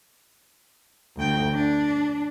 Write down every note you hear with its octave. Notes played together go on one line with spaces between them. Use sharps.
D2 G5
D4